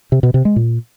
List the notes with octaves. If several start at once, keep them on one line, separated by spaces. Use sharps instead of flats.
C3
B2
C3
G#3
A#2